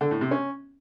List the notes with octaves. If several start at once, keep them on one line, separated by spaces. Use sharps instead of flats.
D3
A2
C3
C#4